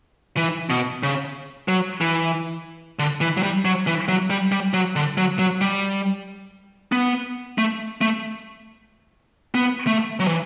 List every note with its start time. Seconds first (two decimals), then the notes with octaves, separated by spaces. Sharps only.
0.37 E3
0.70 B2
1.03 C#3
1.68 F#3
2.01 E3
2.99 D3
3.21 E3
3.37 F#3
3.43 G3
3.65 F#3
3.87 E3
4.08 F#3
4.30 G3
4.52 G3
4.74 F#3
4.96 D3
5.18 F#3
5.39 F#3
5.61 G3
6.92 B3
7.58 A3
8.01 A3
9.55 B3
9.87 A3
10.20 F#3
10.28 E3